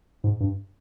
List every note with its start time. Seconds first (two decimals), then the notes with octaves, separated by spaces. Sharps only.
0.24 G#2
0.40 G2